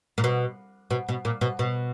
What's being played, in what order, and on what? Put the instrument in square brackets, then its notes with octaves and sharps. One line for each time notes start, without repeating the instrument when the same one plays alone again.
[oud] A#2
B2
B2
B2
A#2
B2
B2